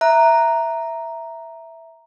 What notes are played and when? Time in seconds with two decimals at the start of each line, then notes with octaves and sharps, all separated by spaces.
0.01 E5 A#5 F#6